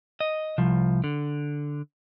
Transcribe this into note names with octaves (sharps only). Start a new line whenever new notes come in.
D#5
C2 F3
D3